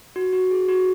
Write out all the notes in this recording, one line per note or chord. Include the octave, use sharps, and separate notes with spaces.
F#4
F#4
G#4
F#4